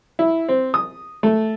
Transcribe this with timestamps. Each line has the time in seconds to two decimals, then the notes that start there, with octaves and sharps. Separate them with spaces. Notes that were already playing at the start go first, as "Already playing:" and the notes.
0.19 E4
0.49 C4
0.74 D#6
1.23 A3